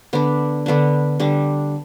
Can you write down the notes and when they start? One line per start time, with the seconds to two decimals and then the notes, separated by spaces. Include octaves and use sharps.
0.13 D3 B3 D4
0.66 D3 B3 D4
1.20 D3 G3 D4